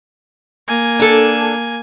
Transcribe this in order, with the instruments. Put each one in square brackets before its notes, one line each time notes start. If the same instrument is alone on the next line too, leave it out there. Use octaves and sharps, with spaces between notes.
[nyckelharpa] A#3 G#5
[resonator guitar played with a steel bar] D4 A4